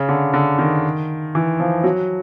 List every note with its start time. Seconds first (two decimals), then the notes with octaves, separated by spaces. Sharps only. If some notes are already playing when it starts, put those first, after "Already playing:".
Already playing: C#3
0.09 D3
0.34 D3
0.59 D#3
1.35 E3
1.60 F3
1.84 F#3